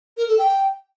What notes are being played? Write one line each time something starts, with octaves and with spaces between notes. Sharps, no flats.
A#4
A4
G5